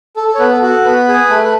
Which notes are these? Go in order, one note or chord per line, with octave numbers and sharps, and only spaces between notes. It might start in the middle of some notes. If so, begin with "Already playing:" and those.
A4
A4
C#5
B3 B4
A4
F#4 A4
B3 B4
G#4
A3
B4